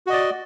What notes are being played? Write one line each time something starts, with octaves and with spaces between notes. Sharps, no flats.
F#4 D5 D#5